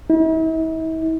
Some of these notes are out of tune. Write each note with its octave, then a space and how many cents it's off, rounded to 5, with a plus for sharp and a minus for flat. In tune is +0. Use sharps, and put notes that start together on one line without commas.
E4 -45